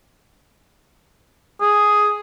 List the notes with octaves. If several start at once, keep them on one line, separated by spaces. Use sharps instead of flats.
G#4